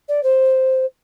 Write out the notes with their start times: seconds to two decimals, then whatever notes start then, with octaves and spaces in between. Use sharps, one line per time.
0.08 D5
0.23 C5